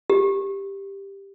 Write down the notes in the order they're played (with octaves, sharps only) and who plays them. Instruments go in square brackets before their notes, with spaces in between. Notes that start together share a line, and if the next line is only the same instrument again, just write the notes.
[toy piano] G4